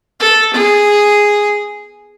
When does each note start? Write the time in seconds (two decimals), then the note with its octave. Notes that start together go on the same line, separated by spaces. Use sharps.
0.20 A4
0.54 G#4